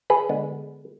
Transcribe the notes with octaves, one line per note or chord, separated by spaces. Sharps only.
G#4 B4
D3 G#3 B3